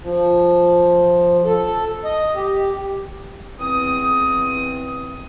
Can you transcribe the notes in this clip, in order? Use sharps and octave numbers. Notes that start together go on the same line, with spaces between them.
F3
A4
D#5
G4
E2 C4 D#6